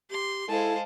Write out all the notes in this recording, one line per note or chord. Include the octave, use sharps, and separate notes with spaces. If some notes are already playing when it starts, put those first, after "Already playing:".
G4 C6
G#3 E4 A4 C5 F5 A5